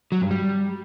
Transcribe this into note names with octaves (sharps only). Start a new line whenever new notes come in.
F#3
G2
G3